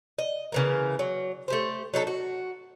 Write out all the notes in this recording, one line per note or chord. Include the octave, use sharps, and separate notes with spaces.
D#5
C#3 E3 A#3
F#3
A3 G4 C5
F#3 D#4 A4
F#4